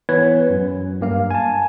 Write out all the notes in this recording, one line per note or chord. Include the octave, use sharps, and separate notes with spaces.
E3 B3 B4 C#5 G#6
F#2
G2 A#3 F5
G#5 A5